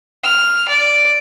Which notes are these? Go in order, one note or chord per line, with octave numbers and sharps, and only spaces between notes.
F6
D5